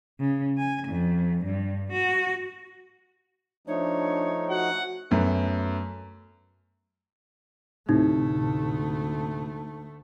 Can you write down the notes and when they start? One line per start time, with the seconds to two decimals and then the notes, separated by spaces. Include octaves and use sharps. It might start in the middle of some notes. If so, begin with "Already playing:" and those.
0.19 C#3
0.58 G#5
0.87 F2
1.44 G2
1.92 F#4
3.67 F3 A3 D4 D#4 C#5
4.50 F#4 F#5
5.11 F#2 A3 B3
7.89 D2 A2 C3 A3 D#4